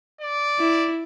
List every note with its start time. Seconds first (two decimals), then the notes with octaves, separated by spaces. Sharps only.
0.21 D5
0.59 E4